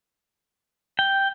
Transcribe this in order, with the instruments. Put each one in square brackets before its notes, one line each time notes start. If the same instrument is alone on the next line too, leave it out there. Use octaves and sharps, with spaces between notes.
[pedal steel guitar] G5